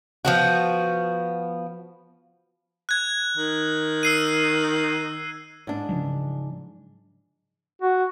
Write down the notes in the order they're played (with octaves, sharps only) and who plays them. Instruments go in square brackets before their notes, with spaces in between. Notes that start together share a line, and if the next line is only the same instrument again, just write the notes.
[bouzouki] F3 B3 F#4
[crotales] F#6 G#6
[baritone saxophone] D#3
[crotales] E6 C7 D#7
[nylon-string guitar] G#2 D4
[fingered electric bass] C#3 F3 F#3
[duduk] F#4